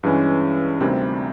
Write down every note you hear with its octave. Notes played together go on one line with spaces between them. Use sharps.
G2 E3 G#3 C#4
D2 C3 D#3 G3 C4